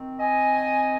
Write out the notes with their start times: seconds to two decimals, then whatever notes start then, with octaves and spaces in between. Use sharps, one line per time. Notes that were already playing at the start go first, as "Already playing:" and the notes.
Already playing: D#3 C4
0.19 D#5 G#5